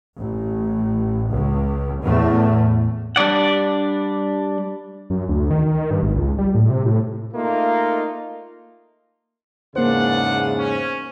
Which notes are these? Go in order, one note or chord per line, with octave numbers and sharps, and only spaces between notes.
A1
C#2
E2 A2 A3
G3 D4 D5 F#5
F#2
D2
D#3
D#3
G2
G#1
C#2
G3
A2
C3
A2
A3 A#3 D#4 F4
E2 G#2 C#3 A#3 D4 F4 C5 F#5
C#4